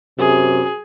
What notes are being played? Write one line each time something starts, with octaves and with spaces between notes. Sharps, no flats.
F#2 C3 G#4